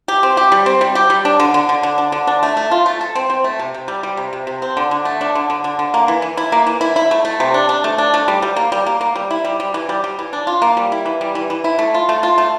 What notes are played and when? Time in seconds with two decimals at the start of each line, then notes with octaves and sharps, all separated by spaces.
0.08 G4
0.23 C4
0.37 G4
0.52 G3
0.66 C4
0.81 G3
0.95 G4
1.10 G3
1.25 D4
1.40 D3
1.54 D3
1.69 D3
1.83 D3
1.98 D4
2.12 D3
2.27 D4
2.43 A3
2.57 A3
2.71 F4
2.86 A3
3.01 A4
3.15 C4
3.30 C4
3.44 A3
3.59 C3
3.74 C3
3.88 G3
4.03 G3
4.17 C3
4.33 C3
4.47 C3
4.62 C4
4.77 D3
4.91 D3
5.05 A3
5.21 D4
5.35 D3
5.50 D3
5.64 D3
5.79 D3
5.94 A#3
6.08 E3
6.22 E3
6.37 E4
6.52 A#3
6.67 E3
6.81 E4
6.96 E4
7.11 A3
7.25 A3
7.40 C3
7.54 D4
7.69 D4
7.84 A3
7.98 D4
8.14 A3
8.28 G3
8.42 G3
8.56 A#3
8.72 G3
8.86 A#3
9.01 A#3
9.16 G3
9.31 E4
9.45 G3
9.60 G3
9.74 E3
9.89 G3
10.04 G3
10.19 E3
10.33 D4
10.47 F4
10.62 A#3
10.77 G3
10.92 E4
11.06 E3
11.21 G3
11.35 E3
11.50 E3
11.64 E4
11.79 A3
11.94 F4
12.09 A3
12.23 F4
12.38 A3